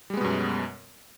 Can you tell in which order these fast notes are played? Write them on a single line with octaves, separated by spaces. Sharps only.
G3 G#3 B3 B2 F#2